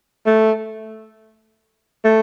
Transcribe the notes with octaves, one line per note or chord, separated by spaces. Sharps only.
A3
A3